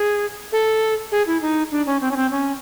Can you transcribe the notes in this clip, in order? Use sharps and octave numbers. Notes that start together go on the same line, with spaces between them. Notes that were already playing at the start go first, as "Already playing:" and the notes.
Already playing: G#4
A4
G#4
E4
D#4
D4
C#4
C4
C#4
C4
C#4